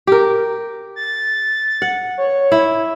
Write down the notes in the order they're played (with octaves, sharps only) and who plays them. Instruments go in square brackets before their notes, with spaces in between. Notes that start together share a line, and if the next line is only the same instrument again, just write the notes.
[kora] G4 A#4
[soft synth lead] A6
[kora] F#5
[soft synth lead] C#5
[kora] E4 E5